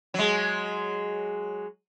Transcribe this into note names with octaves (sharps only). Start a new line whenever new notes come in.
F#3 G#3